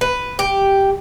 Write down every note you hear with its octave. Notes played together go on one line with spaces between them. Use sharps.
B4
G4